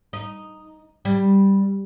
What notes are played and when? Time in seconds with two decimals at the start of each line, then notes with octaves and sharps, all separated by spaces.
0.13 D#4
1.05 G3